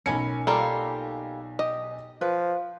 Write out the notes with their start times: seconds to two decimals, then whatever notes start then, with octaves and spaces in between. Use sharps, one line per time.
0.06 B1 C#4 A#4 G#5 B5 C#7
0.47 G3 A#3 F4 A4
1.59 G4 D#5
2.21 F3 B4